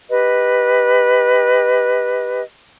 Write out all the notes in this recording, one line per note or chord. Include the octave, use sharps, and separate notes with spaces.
G4 B4 D#5